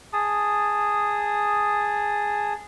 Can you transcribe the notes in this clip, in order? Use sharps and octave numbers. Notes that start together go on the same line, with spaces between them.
G#4 A5 D#6